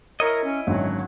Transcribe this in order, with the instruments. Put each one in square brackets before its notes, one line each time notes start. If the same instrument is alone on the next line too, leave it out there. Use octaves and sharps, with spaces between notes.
[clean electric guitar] E4 C#5 D#5 [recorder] A#4
[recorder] C#4
[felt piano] G#1 D3 C#4 [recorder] F#3